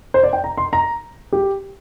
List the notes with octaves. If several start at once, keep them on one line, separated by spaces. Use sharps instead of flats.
C5
D5
G5
A#5
C6
A#5
G4